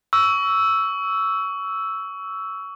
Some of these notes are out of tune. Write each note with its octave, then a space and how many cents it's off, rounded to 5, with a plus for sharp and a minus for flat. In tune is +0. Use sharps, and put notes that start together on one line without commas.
C#6 +25 E6 +0